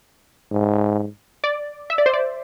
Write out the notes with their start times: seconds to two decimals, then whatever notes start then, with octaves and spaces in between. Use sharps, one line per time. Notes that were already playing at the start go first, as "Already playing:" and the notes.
0.52 G#2
1.44 D5
1.90 E5
1.98 D5
2.06 C5
2.14 D5